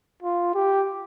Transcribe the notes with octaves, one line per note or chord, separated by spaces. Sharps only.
F4
G4